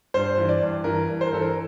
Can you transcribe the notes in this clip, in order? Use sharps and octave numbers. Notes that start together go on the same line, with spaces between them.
G2 C5
E3
D5
G2
E3 A#4
G2
C5
A#4
E3 A4
A#4